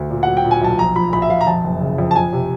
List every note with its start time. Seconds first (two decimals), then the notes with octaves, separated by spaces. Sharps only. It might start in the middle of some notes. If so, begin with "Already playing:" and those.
Already playing: D2
0.10 A#2
0.23 F#3 F#5
0.37 G5
0.45 A#2
0.51 G#5
0.62 B1 A5
0.79 A#1 A#5
0.96 F3 B5
1.13 A#1 B5
1.22 E5
1.30 A#1 F5
1.41 A#5
1.47 F2 A5
1.64 F#1
1.81 C#3
1.98 F2
2.11 A5
2.16 F3 G#5
2.33 C3